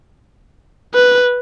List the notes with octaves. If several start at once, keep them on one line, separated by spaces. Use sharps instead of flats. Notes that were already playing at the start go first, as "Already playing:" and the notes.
B4